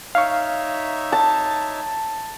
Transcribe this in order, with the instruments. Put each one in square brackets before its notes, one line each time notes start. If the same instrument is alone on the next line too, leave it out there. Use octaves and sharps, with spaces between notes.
[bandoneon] D#4 C#5 E5 [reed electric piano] F5 C#6
[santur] A5